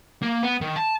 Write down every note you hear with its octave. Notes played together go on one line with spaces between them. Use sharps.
A#3
B3
D#3
A5